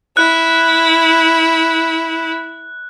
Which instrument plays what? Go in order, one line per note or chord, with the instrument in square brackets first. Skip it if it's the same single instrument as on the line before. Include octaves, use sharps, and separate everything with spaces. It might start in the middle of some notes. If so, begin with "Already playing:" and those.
[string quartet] E4 [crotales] F#6